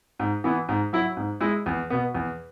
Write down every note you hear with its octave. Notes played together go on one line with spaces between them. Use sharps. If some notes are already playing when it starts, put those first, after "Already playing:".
G#2
E3 B3 E4
G#2
F#3 E4
G#2
G#3 E4
E2
B2 B3
E2